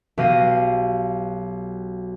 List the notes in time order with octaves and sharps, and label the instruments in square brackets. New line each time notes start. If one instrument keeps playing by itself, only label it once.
[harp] B1 F#3 G4 F5 A#6 D#7